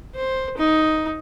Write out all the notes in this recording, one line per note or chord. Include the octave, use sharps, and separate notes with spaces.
C5
D#4